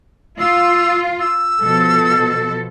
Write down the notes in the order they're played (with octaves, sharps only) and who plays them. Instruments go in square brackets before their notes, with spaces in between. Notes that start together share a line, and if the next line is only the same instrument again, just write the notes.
[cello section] F4 [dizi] E6
[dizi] E6
[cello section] B2 F3 A4